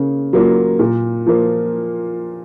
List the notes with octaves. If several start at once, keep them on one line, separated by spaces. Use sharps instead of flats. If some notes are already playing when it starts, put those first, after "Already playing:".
Already playing: C#3 A#3
F#3 A#3 F4
A#2
F3 A#3